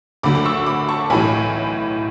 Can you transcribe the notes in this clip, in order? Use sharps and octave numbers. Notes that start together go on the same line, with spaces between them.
D2 D3 F#3 B5 D6
D6
C#6 E6
B5 D6
A5 C#6
B1 A2 E3 G#5 B5